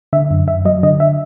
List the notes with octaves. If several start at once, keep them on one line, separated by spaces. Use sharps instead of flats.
D3 E5
F#2
F#2 E5
F#3 D#5
D3 D#5
E5